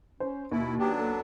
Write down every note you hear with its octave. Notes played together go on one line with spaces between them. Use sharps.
C#4 C5
D#2 B2 E4
F#3 B3 D4 G4
A4